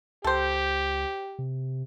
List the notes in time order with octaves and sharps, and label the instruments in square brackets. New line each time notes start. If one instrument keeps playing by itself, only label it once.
[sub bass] C#2 [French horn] G4 [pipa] A4 C5
[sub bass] C3